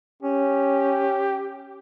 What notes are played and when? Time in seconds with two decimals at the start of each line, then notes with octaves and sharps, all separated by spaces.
0.23 C#4 G4